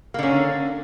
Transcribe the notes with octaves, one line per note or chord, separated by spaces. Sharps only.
D3 A#3 C#4